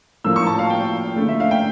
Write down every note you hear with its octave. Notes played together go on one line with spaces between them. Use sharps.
A2 F3 A#3 E6
C#6
A5
F5
G5
D3 A3
E5
F5
G5